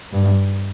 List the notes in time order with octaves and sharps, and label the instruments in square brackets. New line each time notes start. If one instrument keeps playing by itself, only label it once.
[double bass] G2